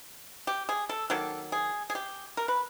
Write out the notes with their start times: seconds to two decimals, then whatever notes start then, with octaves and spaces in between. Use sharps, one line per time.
0.47 G4
0.69 G#4
0.89 A4
1.10 D#3 F#3 A#3 A4
1.52 G#4
1.90 G#4
1.95 G4
2.37 A#4
2.48 B4